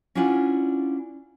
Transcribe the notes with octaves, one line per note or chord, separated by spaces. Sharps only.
C#4 D4 E4 F4 F#5 G#5